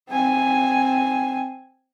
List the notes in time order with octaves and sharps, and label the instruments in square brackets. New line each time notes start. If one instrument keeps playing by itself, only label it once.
[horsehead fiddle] C4 G#5